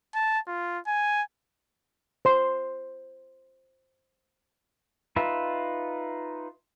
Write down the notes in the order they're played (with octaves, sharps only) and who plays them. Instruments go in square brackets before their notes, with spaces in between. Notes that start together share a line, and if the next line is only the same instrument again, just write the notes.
[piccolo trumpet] A5
F4
G#5
[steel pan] C5 C6
[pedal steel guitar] D#4 F4 B4 E5